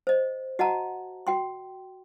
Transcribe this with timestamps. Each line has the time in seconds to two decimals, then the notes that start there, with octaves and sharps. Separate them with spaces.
0.07 C5 D#5
0.59 F#4 D#5 F#5 A5 A#5
1.27 F#4 G5 C6